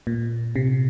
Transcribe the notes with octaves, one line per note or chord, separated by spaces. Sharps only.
A#2
C3